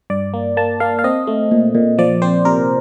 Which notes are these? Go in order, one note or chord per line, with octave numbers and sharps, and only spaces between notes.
G2 D5
A#3
A#3 A5
A#3 F5
F5
C4 D#5
A3
A#2
A#2
F3 D5
C4 C5
C3 A#4